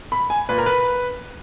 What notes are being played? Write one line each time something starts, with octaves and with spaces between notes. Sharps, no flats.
B5
G#5
A#2 B4
A#4
B4